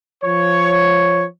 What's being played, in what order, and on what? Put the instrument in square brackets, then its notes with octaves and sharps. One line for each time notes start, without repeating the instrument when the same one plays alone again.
[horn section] F3 C#5